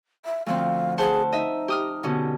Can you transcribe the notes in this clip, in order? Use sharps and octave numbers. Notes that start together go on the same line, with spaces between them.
E5
D2 F3 C4 F5
G#4 C5 F#5 A5
D#4 D#5 E5
G4 D#6 F6
B2 D3 C#4